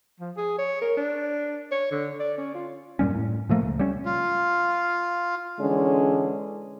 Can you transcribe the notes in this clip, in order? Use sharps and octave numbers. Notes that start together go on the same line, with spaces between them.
F3
G#4
C#5
A#4
D4
C#5
D3
D5
C#4
F4
F#2 A#2 G3 C#4
A2
A#2 F3 A3 A#3
C#2
G3 C#4
F4
D3 E3 G#3 C#4